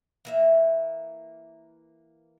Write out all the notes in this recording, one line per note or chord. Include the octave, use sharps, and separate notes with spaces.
E3 A#3 E5